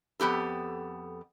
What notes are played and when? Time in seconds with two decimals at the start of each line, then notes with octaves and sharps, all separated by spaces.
0.20 F2 B3 G4 A4